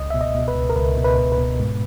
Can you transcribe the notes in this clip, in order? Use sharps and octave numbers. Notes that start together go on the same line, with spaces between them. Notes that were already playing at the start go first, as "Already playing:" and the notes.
Already playing: C#2 D#5
B2 E5
D#5
B2
B4
C#2
A#4
C#2 B4
B2
B4
B2
B4
B2
G#2